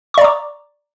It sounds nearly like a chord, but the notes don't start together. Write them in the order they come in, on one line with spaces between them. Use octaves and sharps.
C#6 D5 A#5 D6